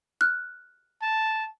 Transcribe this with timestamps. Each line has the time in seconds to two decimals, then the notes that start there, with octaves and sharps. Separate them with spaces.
0.21 F6 F#6
1.02 A5